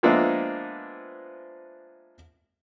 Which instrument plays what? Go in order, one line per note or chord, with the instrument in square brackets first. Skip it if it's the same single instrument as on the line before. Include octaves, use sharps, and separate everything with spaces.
[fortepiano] F3 G#3 A#3 B3 D4 E5